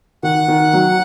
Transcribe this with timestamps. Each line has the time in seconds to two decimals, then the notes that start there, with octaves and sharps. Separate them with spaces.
0.23 D#3 F#5
0.48 D#3
0.73 F#3